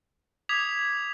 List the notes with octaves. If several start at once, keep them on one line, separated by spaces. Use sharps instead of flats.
D6 D#6 G#6 B6 F7